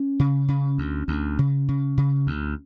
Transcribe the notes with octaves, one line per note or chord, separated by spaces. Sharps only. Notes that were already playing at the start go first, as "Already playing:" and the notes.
Already playing: C#4
C#3
C#3
D2
D2
C#3
C#3
C#3
D2